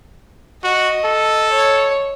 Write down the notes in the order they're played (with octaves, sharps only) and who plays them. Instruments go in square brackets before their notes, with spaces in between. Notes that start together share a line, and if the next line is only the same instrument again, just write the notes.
[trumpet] F#4 [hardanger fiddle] D#5
[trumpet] A4
[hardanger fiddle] C#5